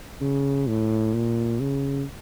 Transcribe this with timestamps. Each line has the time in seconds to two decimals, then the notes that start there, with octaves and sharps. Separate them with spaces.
0.21 C#3
0.68 A2
1.14 A#2
1.61 C#3